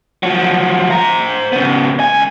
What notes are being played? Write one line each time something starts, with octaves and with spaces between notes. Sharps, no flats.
F3 F#3
C5 A#5
C#3 B3
C#2 G#5